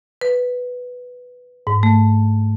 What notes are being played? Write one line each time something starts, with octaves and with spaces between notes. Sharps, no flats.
B4
G#2
A3